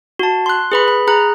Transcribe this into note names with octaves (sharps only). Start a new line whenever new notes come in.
F#4 A5
C6 F#6
G#4 B4 B5
B5
G#4 A#5 F#6